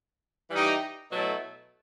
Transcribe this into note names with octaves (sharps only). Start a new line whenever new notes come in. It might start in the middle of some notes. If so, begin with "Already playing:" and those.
E3 G3 D#4 G4
B2 F#3 A3 E4 A4